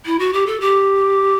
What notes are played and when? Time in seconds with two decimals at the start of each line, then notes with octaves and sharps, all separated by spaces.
0.06 E4
0.19 F#4
0.33 G4
0.47 A4
0.60 G4